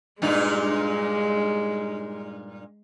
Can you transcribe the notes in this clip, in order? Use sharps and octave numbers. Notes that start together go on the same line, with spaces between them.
G2 A#2 G#3 D#4